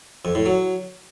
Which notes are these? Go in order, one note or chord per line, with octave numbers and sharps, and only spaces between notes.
F2
A2
F#3